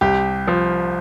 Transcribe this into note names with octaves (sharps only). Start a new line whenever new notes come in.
C2 G4
F3